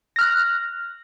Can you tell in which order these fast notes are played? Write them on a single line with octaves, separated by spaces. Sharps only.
A#6 F6 F#6